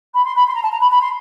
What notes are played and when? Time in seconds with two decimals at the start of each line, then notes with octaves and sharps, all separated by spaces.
0.14 B5
0.25 C6
0.36 B5
0.48 C6
0.55 A#5
0.63 A5
0.72 A#5
0.81 B5
0.91 B5
1.01 C6